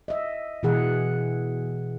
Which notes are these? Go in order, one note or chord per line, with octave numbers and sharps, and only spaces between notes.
D#5 E5
B2 E3 G#4 F#5